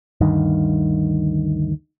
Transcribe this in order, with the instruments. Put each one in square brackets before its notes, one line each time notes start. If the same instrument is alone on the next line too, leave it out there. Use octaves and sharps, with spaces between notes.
[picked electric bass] G1 D2 G2 D#3